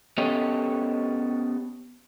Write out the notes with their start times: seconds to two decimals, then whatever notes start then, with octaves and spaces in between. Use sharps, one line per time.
0.18 B3 C#4 G4 A4 C#5 D#5